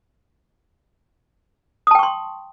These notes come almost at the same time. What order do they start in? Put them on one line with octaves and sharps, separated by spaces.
D#6 A5 G5 C#6 C6